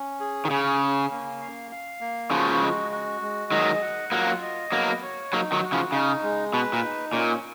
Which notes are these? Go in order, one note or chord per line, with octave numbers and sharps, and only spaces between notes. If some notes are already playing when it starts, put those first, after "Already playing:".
Already playing: C#4
G#4
D#3
C#3 C#4
C#4
A#3
F5
F5
A#3
C#3 F3 F#4
G#3
F#4
G#3
D#3 F#3 D#5
F#5
F#3 A#3 F4
D#5
F#3 A#3 B3
C#5
F#3 A#3 D#4
D#3 F#3
F#4
C#3 F3
C#3 D#4
G#3
B2 B4
A#2
D#4
A#2 C#4